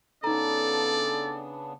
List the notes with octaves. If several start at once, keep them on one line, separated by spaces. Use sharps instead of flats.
C#3 B3 D4 D#4 A4 D5 A#5